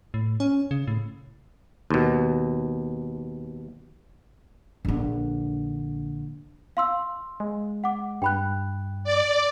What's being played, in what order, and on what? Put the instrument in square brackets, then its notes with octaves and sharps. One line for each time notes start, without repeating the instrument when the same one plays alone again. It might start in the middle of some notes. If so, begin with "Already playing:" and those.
[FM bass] A2
C#4
C#3
A2
[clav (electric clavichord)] D#2 B2
[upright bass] A#1 D3
[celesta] F5 C6 E6
[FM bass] G#3
[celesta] F#5 D6
[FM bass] G2 [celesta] G5 B5 F#6
[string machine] D5